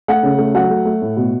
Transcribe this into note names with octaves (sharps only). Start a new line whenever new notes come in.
A3 F#5
C#3
A3
F#3 F#5
A3
A3
A2
B2